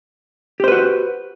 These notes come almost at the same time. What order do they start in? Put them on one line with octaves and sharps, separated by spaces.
G4 C5 B4 F#4